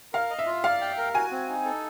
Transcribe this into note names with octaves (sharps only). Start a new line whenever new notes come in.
A#4 F5
D#5
E5
F4
D5 F5
G5
A#4
F#4 G#5
C4
D#4
A4